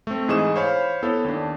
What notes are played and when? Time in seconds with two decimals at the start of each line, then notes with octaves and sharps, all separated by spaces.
0.07 A3 C4
0.28 G#2 E3 G#4 D#5 C#6 E7
0.56 C5 C#5 F5 B5
1.03 B3 E4 A4 C#5
1.25 D#2 D4